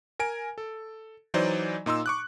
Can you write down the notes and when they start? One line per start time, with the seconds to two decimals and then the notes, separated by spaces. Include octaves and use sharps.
0.19 A#4 G#5 D7
0.58 A4
1.34 E3 F#3 D#4 C5 D5 D#5
1.86 A#2 D#4 C6 E6
2.06 C#6 D6 F#6